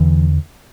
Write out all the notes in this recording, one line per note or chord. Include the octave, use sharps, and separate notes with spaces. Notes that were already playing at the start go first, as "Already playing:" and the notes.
Already playing: E2 D3 E3